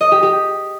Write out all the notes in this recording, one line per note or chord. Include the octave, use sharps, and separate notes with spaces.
D#5
G4
G4